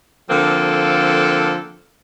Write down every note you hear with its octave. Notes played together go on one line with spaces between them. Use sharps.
D3 F3 A#3 C4 A4